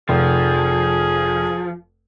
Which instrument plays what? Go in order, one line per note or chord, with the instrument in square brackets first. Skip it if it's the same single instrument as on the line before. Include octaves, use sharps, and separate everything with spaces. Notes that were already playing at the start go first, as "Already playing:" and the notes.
[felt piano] F1 [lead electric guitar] F3 [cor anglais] G#4